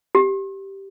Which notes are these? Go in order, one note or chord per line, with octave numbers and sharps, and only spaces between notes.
G4